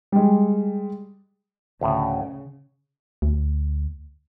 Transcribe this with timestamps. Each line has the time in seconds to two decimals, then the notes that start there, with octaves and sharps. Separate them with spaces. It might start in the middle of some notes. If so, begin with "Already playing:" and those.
0.12 G3 G#3
1.81 D2 A2 C#3
3.22 D2